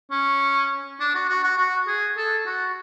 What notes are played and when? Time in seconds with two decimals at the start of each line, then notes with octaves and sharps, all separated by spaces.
0.11 C#4
1.00 D4
1.15 F#4
1.29 F#4
1.44 F#4
1.58 F#4
1.88 G#4
2.17 A4
2.47 F#4